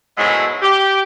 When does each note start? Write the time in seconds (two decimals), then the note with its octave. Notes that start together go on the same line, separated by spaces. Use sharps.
0.17 G#2 B2 F#3 G#3 A3 E4
0.61 G4